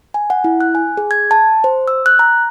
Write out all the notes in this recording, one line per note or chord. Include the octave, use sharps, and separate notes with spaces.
G#5
F#5
E4
F#6
G#5
G#4
G#6
A5
C5
E6
F#6
A#5